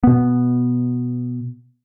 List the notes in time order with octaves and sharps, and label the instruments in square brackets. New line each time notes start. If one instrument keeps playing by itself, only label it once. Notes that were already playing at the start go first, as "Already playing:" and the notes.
[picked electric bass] B2 B3